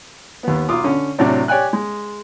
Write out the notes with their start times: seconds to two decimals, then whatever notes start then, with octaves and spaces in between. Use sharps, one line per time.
0.43 D#2 B3
0.68 B1 F4 D6 D#6
0.84 D3 C#4
1.19 A2 C3 F#3 D4
1.48 G4 C#5 D5 G5 G#5 F#6
1.73 G#3